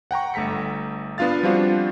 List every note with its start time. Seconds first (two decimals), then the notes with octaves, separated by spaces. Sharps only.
0.11 F#5 G5 A#5 C#6
0.34 G1 A3 A#5 B6 C#7
1.18 B3 D4 F4 F5 A6
1.43 F3 G3 C4 D4 F4 F#4